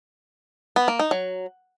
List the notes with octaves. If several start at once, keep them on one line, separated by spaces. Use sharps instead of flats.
B3
A#3
D#4
F#3